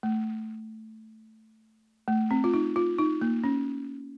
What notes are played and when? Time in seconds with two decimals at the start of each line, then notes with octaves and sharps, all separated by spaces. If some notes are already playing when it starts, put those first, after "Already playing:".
0.03 A3
2.08 A3
2.31 C4
2.44 F4
2.54 D#4
2.76 F4
2.98 D#4
3.21 A#3
3.43 C#4